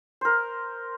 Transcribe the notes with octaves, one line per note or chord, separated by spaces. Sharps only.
A#4 C5